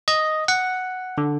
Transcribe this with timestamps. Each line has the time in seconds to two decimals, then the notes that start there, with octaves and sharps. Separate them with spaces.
0.08 D#5
0.48 F#5
1.18 D3